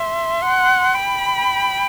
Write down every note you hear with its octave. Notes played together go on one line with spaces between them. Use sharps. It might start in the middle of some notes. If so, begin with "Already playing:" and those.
Already playing: E5 C6
F#5
G5 B5